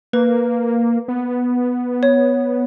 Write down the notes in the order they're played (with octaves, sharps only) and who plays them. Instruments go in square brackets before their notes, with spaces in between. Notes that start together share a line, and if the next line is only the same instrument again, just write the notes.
[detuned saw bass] A#3 [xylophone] B4
[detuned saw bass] B3
[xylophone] C#5